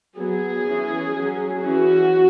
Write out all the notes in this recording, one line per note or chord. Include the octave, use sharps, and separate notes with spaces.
F#3 B3 G#4
E3 C#4
F#3 C#4
E3 C#4 F#4